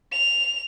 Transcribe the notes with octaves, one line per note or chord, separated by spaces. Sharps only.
F7